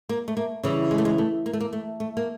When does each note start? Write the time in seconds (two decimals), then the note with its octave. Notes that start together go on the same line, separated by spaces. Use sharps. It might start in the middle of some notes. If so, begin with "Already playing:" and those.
0.09 A#3
0.28 A3
0.37 A#3
0.63 C#3 E3 G3
0.91 G#3
0.98 A3
1.05 G#3
1.18 A3
1.46 A#3
1.53 A3
1.60 A#3
1.73 A3
2.00 A3
2.17 A#3